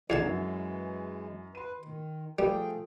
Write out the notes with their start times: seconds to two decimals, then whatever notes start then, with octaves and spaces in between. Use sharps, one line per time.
0.10 E2 D3 E3 G#3 A5 G#6 A6 C7
0.22 F#2 F#3
1.55 B4 C6 D#7
1.78 D#3
2.39 F3 G3 A3 G#4 G5